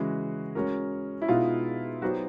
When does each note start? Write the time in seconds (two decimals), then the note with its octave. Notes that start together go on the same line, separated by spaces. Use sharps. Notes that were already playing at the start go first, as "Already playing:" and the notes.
Already playing: C#3 E3 G#3 F#4
0.55 G#3 C#4 F#4 A#4
1.22 E4
1.28 B2 G#3 B3 D#4 F4
2.02 F#3 B3 D#4 F#4 G4 C5